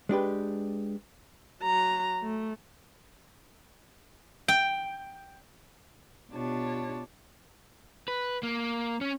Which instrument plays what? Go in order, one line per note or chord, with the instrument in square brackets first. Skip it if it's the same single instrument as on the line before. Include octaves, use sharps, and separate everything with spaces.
[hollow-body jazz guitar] G#3 D4 G4 B4
[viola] F#3 A#5
A3
[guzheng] G5
[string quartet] B2 D4 F4 G4 C#5 A5
[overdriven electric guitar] B4
A#3
C#4